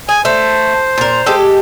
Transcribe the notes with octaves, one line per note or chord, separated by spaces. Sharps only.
G#4 G#5
A3 C5
A#2 A#4
G#3 G4 A4